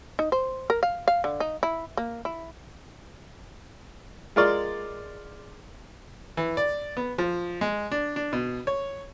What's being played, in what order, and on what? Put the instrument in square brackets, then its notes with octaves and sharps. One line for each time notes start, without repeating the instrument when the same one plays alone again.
[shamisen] D#4
C5
A#4
F5
F5
D3
D#4
E4
A#3
E4
[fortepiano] G#3 F4 A#4 D5
E3
D5
B3
F3
G#3
D4
D4
B2
C#5